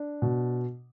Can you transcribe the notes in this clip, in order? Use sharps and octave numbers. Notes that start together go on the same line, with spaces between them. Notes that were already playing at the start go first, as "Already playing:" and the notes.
Already playing: D4
B2